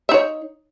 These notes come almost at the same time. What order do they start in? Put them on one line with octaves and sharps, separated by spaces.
E5 D#4 C#5